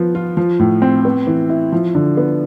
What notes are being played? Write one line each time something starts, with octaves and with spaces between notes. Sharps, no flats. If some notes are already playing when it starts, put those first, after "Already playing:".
Already playing: F3 B3
F4
F3
A2
C4
B3
E3
E4
F3
D3
B3